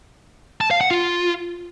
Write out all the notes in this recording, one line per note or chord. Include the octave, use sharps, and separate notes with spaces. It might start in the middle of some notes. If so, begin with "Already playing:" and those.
A5
F5
F#5
F4